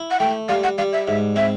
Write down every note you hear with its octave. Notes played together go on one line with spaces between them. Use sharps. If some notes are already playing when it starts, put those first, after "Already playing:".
Already playing: E4
F#5
A3 G5
G3 F5
F#5
G3 F5
E5
G#2 E5
C4 E5